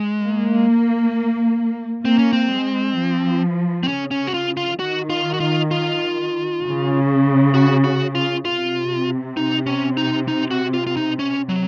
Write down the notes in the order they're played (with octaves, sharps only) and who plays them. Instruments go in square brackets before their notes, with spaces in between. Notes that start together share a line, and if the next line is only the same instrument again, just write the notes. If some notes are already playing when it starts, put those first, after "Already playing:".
Already playing: [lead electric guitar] G#3
[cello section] A#3
[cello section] A#3 [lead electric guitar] C4
[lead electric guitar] C#4
C4
[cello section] G#3
F3
[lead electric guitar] C4
[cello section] C#3 [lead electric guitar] C#4
[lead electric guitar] C#4
F#4
F4
F4
[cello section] D#3 [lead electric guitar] F#4
[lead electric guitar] F4
F#4
F4
F4
[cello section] C#3
[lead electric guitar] F#4
F#4
F4
[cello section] C3 [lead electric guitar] F4
[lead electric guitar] D#4
C#4
D#4
D#4
F#4
F4
F4
D#4
C#4
F#3